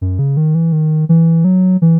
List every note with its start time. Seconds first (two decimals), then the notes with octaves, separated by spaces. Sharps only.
0.01 F#2
0.19 C#3
0.37 D#3
0.55 E3
0.72 D#3
1.09 E3
1.44 F#3
1.82 E3